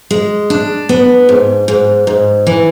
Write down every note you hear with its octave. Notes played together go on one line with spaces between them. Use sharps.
G#3
D4
B3
G#2
G#2
G#2
E3